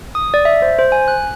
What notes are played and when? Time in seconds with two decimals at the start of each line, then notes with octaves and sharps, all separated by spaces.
0.15 D#6
0.34 D5
0.45 E5
0.62 C5
0.79 C5
0.92 G#5
1.08 F#6